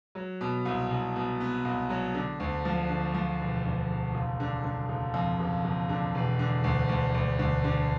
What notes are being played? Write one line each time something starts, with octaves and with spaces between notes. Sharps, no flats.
F#3
B2
C2
C2
B2
B3
C2
F#3
D3
D2
F3
D3
F3
E1
D2
E1
F#1
D3
D3
F#1
F2
F#1
F#1
D3
E1
D3
D2
D2
D2
D2
D3